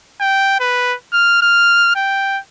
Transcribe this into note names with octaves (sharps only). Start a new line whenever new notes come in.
G5
B4
F6
F6
G5